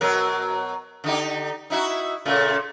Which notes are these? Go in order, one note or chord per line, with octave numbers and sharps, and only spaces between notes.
B2 F#3 A#4
D3 D#4 G4
D#4 E4 F#4
A#2 C#3 A3